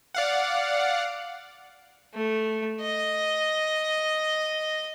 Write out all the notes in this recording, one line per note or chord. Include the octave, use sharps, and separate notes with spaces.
D5 F5 F#5
A3
D#5